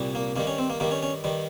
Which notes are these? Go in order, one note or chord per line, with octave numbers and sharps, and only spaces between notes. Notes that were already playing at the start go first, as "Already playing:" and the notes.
Already playing: C2 A#2 G3
A#3
G2 D#3 G3 A#3
C#4
C4
A#3
G2 D#3 G3 A#3
C#4
C#4
G2 D#3 G3